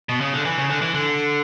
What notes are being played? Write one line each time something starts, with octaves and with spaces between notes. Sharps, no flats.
B2
C#3
D3
E3
C#3
D3
E3
D3